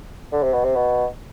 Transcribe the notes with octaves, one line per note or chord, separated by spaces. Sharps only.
D3
C3
B2
C3
B2